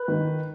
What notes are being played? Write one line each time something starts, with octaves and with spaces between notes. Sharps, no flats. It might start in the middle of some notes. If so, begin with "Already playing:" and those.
Already playing: B4
D#3